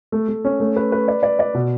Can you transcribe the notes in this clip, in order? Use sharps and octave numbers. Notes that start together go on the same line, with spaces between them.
A3
A3
C#4
A3
B4
B4
D5
D5
D5
B2